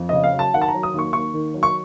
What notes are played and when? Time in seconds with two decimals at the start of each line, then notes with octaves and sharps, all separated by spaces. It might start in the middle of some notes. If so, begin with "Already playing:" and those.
Already playing: F2
0.09 C#3 D#5
0.24 F5
0.33 F#3
0.39 A5
0.54 D#3 F#5
0.62 A5
0.68 A#5
0.74 F#3
0.83 D#6
0.94 D#2
0.99 C#6
1.13 D#2 C#6
1.34 D#3
1.54 F#3
1.63 C#6